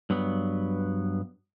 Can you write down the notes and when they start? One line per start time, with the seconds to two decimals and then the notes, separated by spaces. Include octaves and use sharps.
0.10 G2 F#3 B3